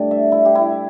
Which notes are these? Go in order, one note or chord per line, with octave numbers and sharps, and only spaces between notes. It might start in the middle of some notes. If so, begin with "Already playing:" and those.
Already playing: A2 G3 D4 D5
E5
E4
G4
E4